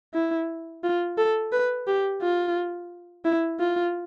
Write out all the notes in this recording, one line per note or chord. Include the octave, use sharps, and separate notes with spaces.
E4
F4
A4
B4
G4
F4
E4
F4